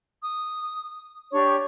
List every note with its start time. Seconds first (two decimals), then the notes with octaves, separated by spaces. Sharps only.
0.22 D#6
1.32 D4 G4 C#5 C#6